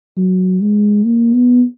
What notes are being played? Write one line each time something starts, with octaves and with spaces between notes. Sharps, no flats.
F#3
G#3
A#3
B3